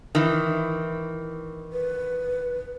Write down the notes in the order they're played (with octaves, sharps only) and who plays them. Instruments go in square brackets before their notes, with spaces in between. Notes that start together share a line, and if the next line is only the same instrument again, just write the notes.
[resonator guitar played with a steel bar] D#3 E3
[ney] B4